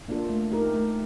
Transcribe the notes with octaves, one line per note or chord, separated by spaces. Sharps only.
A#3 D4 F4 A4
A3
D#4 G4 A#4
A3